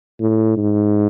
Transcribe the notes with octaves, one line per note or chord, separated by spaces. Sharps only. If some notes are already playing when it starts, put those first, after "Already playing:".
A2
G#2